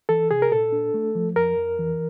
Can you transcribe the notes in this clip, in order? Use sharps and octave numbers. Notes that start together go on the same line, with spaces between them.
E3 A4
C3 G#4
A#4
A#2 A4
D4
A3
F3
F2 A#4
F2
E3